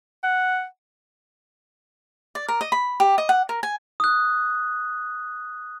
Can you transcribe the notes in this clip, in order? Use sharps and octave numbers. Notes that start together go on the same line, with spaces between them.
F#5
D5
A#4
D#5
B5
G4
D#5
F#5
A#4
G#5
D#6 F#6